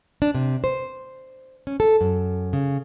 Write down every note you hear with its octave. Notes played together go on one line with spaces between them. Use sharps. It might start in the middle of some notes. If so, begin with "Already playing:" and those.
D4
C3
C5
C#4
A4
F#2
C#3